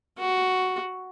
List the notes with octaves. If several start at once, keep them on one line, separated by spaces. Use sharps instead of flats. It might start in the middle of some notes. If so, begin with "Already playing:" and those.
F#4